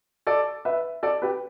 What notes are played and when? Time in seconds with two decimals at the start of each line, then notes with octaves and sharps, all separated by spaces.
0.27 A4 D5
0.65 B4 E5
1.03 A4 D5
1.22 G4 B4